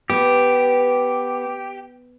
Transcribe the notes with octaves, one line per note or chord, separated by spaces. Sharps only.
B3 G4